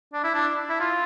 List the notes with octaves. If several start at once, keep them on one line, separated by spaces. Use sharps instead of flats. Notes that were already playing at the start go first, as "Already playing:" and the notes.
D4
E4
D4
E4
F4